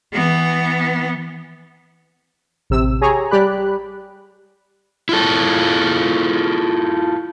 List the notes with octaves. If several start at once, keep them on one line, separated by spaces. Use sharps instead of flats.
E3 B3
A1 C3 E6
G4 G#4 C#5 G#5 A#5
G3 G4 D5 B5 F#6
E4 F4 A4